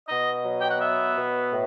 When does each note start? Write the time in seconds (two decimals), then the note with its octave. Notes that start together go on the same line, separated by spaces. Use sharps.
0.09 B2 D#5
0.44 F#3
0.61 G5
0.71 F#5
0.80 B3 E5
1.16 B2
1.51 A2